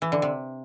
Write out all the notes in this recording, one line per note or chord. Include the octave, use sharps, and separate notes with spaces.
E3
D3
C3